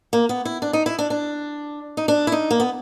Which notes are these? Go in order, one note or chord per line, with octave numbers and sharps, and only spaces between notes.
A#3
B3
E4
D4
D#4
E4
D4
D4
D#4
D4
E4
D#4
A#3
B3